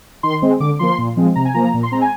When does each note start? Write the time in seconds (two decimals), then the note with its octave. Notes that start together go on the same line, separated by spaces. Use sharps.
0.23 D#3 C6
0.42 G#3 C4
0.60 D3 D6
0.79 F3 A#3 C6
0.99 A#2
1.17 F3 G#3 C4
1.36 C3 A#5
1.45 G#5
1.54 F3 A#3 A#5
1.64 A#5
1.74 A#2
1.83 C6
1.92 G#3 C4 A#5
2.01 G#5